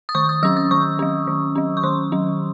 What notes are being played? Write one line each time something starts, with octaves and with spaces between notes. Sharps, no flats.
D#6
D#3 C#6
D#6
F#3 C#4 E6
D#6
D#3 C#6
F#3 C#4
D#3
F#3 C#4
C#6
D#3 C6
F#3 C#4